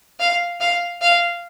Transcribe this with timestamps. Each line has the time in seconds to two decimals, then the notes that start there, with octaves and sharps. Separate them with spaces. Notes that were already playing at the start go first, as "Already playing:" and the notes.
0.19 F5
0.60 F5
1.01 F5